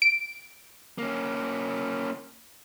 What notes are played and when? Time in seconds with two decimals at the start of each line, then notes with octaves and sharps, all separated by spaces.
0.02 D7
0.98 A#3 C#4